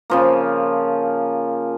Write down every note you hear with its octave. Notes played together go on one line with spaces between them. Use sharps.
C#3 F3 A#3